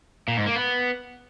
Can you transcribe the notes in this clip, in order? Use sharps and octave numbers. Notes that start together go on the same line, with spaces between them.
A#2
G#2
A#3
B3